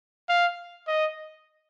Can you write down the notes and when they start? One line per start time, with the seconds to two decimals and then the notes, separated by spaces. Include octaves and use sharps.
0.29 F5
0.88 D#5